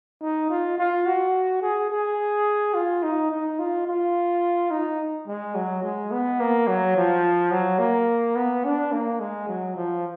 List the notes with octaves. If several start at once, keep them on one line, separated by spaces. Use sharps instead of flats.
D#4
F4
F4
F#4
G#4
G#4
F4
D#4
D#4
F4
F4
D#4
G#3
F#3
G#3
B3
A#3
F#3
F3
F#3
A#3
B3
D4
A#3
G#3
F#3
F3